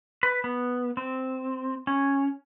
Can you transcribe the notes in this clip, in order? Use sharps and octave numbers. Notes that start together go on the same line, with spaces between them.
B4
B3
C4
C#4